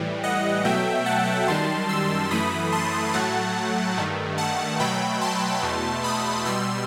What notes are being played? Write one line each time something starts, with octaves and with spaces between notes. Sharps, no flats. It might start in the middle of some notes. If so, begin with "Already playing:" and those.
Already playing: A2 E3 G3
D#5 F#5
B2 F#3 A3 E5 G5
F#5 A5
F#2 D#3 G3 A5 C6
C6 E6
F#2 E3 A3 B5 D#6
A5 C6
A2 F#3 A3 F#5 A5
G2 D#3 A3
F#5 A5
B2 F#3 A3 G5 B5
A5 C6
E2 B2 A3
B5 D#6
B2 G3 C6 E6